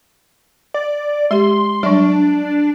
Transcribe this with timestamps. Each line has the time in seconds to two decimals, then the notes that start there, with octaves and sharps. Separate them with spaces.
0.74 D5
1.31 G#3 G4 C6
1.83 F#3 G3 D4